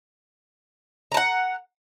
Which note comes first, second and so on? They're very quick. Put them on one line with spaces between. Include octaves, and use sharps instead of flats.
A#5 A5 F#5